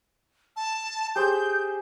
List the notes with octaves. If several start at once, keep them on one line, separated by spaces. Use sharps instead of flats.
A5
G4 G#4 C5 G6